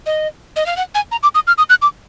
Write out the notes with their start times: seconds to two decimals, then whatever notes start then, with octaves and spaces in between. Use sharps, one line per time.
0.06 D#5
0.56 D#5
0.66 F5
0.77 F#5
0.94 G#5
1.11 A#5
1.23 D6
1.35 D#6
1.47 F6
1.58 D#6
1.70 F#6
1.82 D6